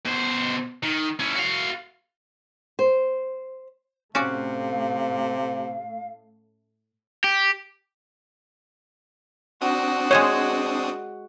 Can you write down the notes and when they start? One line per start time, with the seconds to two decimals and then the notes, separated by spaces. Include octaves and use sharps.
0.06 B2 C5
0.83 D#3
1.20 C#4 E4
1.36 F#4 F5
2.79 C5
4.15 A2 C3 A3 C#4 F#4 D5 F5
7.24 G4
9.61 C4 D4 F#4 D#6
10.11 G#3 G#4 C5 C#5